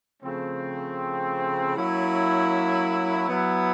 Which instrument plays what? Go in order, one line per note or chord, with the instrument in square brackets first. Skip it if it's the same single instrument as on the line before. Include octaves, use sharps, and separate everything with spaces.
[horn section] C#3 F3 A3 C4
F#3 A#3 C#4 E4
F#3 B3 E4